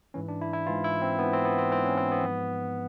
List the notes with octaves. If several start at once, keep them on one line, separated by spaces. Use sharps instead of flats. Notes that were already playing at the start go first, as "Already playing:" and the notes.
G#2 E3 C#4
D4
E4
E4
G#2 E3 F4
E4
C4
G#2 E3 B3
C4
B3
C4
G#2 E3 C4
C#4
C4
B3
G#2 F3